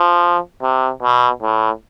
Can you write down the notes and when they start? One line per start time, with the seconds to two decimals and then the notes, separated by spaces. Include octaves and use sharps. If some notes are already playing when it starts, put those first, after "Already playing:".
Already playing: F3
0.62 C3
1.02 B2
1.42 A2